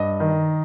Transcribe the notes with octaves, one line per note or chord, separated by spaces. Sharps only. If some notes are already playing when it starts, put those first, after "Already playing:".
Already playing: G2 D#5
D#3